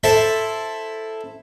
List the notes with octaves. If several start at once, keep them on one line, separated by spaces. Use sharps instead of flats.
E4 A4 C5 E5